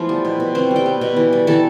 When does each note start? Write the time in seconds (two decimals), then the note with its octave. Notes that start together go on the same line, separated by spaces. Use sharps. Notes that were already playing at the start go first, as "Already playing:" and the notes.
Already playing: E3 F3 A3 B3 F4
0.09 G3
0.25 B2
0.40 B2
0.55 B3 C4 C5
0.71 G3
0.76 G4 G5
0.86 B3
1.01 B2
1.16 E3
1.33 G3
1.47 E3 A4 A5